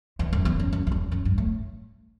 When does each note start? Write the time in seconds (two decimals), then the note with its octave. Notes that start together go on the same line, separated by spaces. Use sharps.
0.19 E2
0.33 F#2
0.45 E2
0.60 F#2
0.72 F#2
0.87 F#2
0.92 E2
1.12 F#2
1.25 G2
1.38 A2